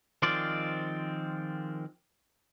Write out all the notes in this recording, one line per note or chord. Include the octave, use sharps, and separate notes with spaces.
D#3 F3 G#3 C4 F4 D5